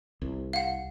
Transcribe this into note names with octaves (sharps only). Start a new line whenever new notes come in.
C2
F5 F#5